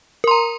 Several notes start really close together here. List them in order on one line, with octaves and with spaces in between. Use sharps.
A#4 C6 A#5